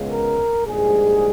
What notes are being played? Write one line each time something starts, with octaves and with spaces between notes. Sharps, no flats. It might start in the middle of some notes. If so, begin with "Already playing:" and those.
Already playing: C#2 C#3 G#3 B3
A#4
A#1 G#2 G3 G#4